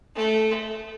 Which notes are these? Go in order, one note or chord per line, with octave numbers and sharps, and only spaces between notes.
A3